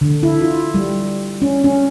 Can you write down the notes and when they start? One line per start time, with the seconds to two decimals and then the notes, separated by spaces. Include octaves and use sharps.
0.01 D3
0.23 E4
0.41 F4
0.74 G3
1.42 C#4
1.64 C#4